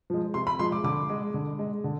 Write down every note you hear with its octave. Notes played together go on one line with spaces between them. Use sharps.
F3 G#3
C3 C6
B5
F3 G#3 C6
D6
D3 D6
G#3
D3
G#3
D3